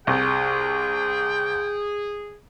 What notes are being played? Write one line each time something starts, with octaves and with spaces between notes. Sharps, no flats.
C2 G#4 G5